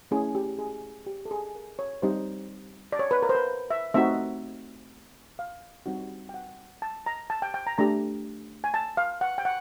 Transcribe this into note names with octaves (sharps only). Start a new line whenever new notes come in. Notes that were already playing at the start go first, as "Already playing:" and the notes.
A3 C#4 E4 G#4
G4
G#4
G4
A4
G#4
A#4
C#5
G3 C4 D#4 G4 C5
D5
C#5
B4
A#4
C5
B4
E5
A3 C4 D#4 F#4 E5
F5
G3 C4 D#4 F#4
G5
F#5
A5
A#5
A5
G5
G5
A#5
A3 D4 G4 A#5
G#5
A5
F5
F#5
G5
F#5